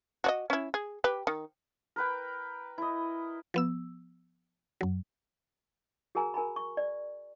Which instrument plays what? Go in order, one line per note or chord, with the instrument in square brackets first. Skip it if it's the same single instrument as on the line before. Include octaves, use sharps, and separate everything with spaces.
[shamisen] F#4 D5 D#5
C#4 E4
G#4
G4 B4
D#3
[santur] A#4 B4 G5
E4 D#5
[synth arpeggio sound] F3 B3 E6
F#2 F#3
[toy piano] F#4 G#4 A#4 G#5 A#5
A#4 G#5 A#5 B5
C#6
D5